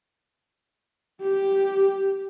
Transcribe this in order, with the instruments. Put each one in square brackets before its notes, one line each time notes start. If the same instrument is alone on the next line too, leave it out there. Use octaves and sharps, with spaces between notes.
[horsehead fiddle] G4